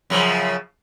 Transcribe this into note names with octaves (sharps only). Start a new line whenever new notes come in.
F#2 C#3 F3